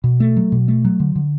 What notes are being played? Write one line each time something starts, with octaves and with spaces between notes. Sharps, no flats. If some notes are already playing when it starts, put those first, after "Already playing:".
B2
A3
F#3
B2
A3
F#3
D3
D3